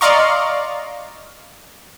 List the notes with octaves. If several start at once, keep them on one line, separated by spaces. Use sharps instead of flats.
D5 D#5 F5 A#5 C6 C#6